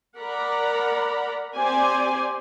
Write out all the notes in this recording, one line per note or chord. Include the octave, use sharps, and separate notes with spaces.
A#4 D5 F#5 A#5 B5
C4 G4 C5 D5 G#5